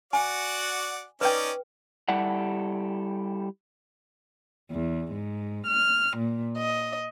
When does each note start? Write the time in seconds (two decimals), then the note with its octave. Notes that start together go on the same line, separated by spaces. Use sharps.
0.13 F#4 D5 F#5 G#5
1.21 C#4 D#4 B4 D5 G5
2.08 G3 E4 G4 A4 D5 F#5
4.71 E2
5.13 G#2
5.66 F6
6.17 A#2
6.59 D#5